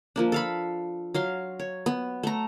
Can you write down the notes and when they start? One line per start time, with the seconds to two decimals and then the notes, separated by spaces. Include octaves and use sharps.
0.16 F3 A#3 D4
0.32 A4 F5 B5
1.14 F#3 F5 C6
1.59 C#5
1.86 B3
2.23 A3 A#5